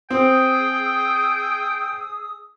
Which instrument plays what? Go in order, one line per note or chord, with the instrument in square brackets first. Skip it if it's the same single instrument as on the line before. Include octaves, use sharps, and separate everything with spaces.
[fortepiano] C4 [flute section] G#4 D#6 E6 [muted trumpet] G5